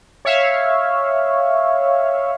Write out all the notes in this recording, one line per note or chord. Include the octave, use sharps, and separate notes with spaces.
C#5 E5 F5